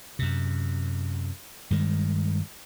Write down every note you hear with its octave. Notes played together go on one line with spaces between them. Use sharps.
F#2 C3
G2 D#3 G#3